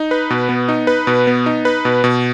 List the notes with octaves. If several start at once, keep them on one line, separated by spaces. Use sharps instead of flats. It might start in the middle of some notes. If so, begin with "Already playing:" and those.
Already playing: D#4
B4
B2
B3
D#4
B4
B2
B3
D#4
B4
B2
B2